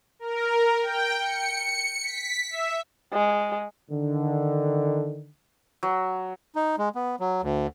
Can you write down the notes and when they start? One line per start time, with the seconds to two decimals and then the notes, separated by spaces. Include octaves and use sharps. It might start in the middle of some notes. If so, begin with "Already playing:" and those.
0.19 A#4
0.81 G5
1.19 C#7
2.02 B6
2.50 E5
3.13 G#3
3.90 D3 D#3
5.83 F#3
6.55 D#4
6.78 G#3
6.95 B3
7.20 F#3
7.42 D2